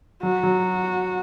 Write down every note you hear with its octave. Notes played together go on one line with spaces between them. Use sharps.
F#3 F#4
F#3